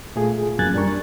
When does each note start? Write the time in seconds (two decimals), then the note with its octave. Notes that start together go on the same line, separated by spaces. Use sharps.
0.16 A#2 A3 F4 G#4
0.59 F#2 A#3 G#5 F#6 G#6 A6
0.74 G3 D4 A#4 C#6